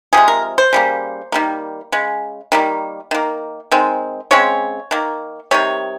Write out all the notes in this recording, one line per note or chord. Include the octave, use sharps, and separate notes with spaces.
C3 F3 G#3 G#4
A#4
C5
C#3 G3 A#3
D#3 G3 A#3
C#3 G#3
D#3 G3 A#3
D#3 A#3
D#3 G#3 C4
C#3 G#3 C4 C#5
D#3 A#3
C3 D#3 G3 C#5